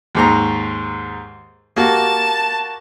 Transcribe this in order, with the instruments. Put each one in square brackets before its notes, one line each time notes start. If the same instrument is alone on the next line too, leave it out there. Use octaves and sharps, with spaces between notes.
[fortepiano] D#2 G#2 A#5
[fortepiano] A#3 F#4 G4 [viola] A5